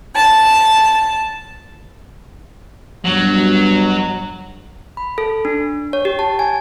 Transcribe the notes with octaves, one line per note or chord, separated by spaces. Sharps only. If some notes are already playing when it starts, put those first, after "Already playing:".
A5
G2 B2 F#3
B5
A4
D4
C#5
G4
A5
G#5